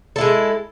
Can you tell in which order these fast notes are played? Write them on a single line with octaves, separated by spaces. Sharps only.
A4 E4 G#3